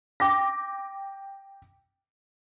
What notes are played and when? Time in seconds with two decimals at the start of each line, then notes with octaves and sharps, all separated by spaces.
0.20 G5 D6 A#6